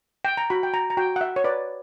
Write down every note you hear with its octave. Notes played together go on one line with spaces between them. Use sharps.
G5
A#5
F#4 B5
G5
A#5
A#5
F#4 G5
F#5
E5
C#5
B4 D5